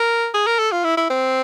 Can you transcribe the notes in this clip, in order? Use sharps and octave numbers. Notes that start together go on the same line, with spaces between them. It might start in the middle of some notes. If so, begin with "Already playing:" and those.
Already playing: A#4
G#4
A#4
A4
F4
E4
E4
C4